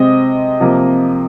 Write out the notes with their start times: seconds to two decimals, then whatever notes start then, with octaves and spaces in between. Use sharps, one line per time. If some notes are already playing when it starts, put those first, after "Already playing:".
Already playing: C3 G#3 C4 D#5
0.60 C3 F3 A#3